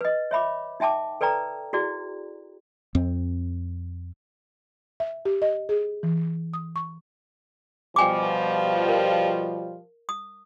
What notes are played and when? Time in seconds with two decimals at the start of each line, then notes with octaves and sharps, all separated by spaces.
0.01 B4 D#5
0.31 C#5 E5 B5 D6
0.80 D#4 E5 G5 A5 D6
1.21 A4 B4 D5 G5 A#5
1.73 E4 F#4 G#4 D5
2.95 F2 C4
5.00 E5
5.25 G4
5.42 D#5
5.69 G#4
6.03 E3
6.53 D#6
6.76 C#6
7.96 B2 F3 G3 G5 G#5 D6
8.89 A#4
10.09 D#6